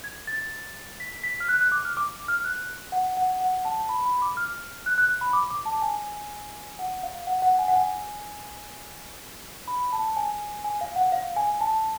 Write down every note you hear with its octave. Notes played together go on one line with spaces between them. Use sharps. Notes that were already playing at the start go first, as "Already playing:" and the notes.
G#6
A6
B6
B6
F6
F#6
F#6
D6
F6
D6
F6
F#6
F#5
F#5
F#5
A5
B5
B5
D6
F6
F#6
F#6
B5
D6
D6
A5
G#5
F#5
F5
F#5
F#5
G#5
F#5
G#5
B5
A5
G#5
G#5
F5
F#5
F5
G#5
A5